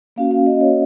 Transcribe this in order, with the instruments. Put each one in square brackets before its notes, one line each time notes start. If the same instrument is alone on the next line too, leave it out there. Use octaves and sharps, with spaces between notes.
[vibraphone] A#3 C#4 F#4 F5
F5
D#5
C#5